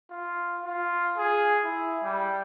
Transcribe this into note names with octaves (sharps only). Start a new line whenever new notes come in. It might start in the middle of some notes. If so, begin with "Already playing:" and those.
F4
F4
G#4
E4
G3